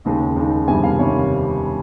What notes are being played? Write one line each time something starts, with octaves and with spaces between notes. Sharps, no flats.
D#2 C#3 G#3 D#4
D#2 C#3 G#3 D#4
G1 F2 C3 D#3 G3 G#5
F5
C3 D#3 G3 C#5